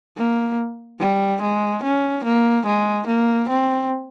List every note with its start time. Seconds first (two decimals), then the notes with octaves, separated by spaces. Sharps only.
0.18 A#3
1.00 G3
1.42 G#3
1.83 C#4
2.25 A#3
2.66 G#3
3.07 A#3
3.49 C4